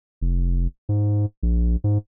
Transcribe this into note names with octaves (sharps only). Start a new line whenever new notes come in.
F1
G#2
A#1
G#2